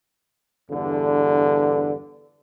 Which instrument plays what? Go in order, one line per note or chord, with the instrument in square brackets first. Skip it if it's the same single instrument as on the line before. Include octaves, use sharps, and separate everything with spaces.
[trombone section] E2 G2 D3